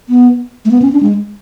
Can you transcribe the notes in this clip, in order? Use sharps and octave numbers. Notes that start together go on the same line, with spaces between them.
B3
A3
B3
C#4
D4
G#3